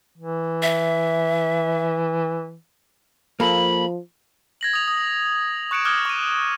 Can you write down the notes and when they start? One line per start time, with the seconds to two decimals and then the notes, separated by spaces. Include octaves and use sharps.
0.18 E3
0.62 E5
3.40 F3 A#3 A4 B5
4.61 G#6 A#6 F#7
4.73 D#6 F7
4.88 D#6
5.71 C#6 F#6 C#7 D7 E7
5.85 D6 D#6 F6 F#6 G#6 G7
6.05 C#6 D#7